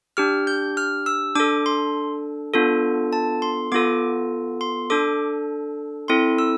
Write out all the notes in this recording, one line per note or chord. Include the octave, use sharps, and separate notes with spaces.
D4 G4 F6
G6
F6
E6
D4 A4 D6
C6
B3 D4 F4 A4
A5
C6
B3 F4 A4 D6
C6
D4 A4 D6
C4 E4 A4 C6
E6